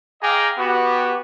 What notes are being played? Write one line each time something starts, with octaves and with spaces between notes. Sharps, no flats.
G#4 D#5 F5 G5 A#5 D6
B3 F#4 G4